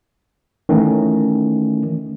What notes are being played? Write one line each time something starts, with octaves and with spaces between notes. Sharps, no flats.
D#3 E3 A3 C#4